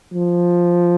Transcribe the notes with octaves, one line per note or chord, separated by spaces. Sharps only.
F3